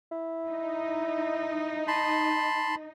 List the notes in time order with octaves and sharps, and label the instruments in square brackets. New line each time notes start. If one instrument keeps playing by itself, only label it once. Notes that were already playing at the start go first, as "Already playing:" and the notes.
[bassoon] E4
[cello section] D#4
[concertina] A5 B5 C6